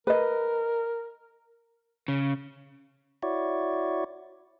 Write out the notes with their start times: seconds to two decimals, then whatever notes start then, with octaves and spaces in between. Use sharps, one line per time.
0.07 A#4 B4 D#5
2.08 C#3
3.23 E4 F#4 C#5 D5